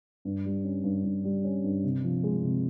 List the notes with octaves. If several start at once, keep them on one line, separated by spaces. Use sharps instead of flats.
G2
G3
C#4
G2
G2
G3
C#4
G2
C3
F3
G#3
C3